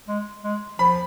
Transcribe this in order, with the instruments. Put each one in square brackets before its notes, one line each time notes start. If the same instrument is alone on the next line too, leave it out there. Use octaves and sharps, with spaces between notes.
[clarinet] G#3
G#3
[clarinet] F3 [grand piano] B5